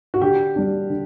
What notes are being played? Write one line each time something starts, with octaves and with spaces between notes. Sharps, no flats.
F#4
D3 G4
G3 D4
D3